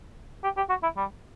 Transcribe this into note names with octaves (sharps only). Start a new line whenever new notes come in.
G4
G4
F#4
E4
G3